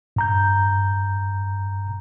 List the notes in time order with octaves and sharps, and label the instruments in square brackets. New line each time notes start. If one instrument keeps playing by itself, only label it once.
[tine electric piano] G2 A#5 G6